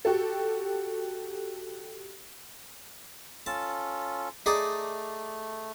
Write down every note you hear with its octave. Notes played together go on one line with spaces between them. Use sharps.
F#4 G4 A4
C#4 F4 A4 A5
A3 D#4 G#4 D5